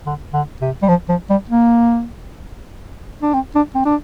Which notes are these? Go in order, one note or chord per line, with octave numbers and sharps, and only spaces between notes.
D3
D3
C3
G3
F3
F3
G3
A#3
D4
C4
D4
C4
D4